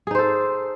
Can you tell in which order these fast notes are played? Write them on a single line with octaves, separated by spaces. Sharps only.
G#4 D#4 C5 A4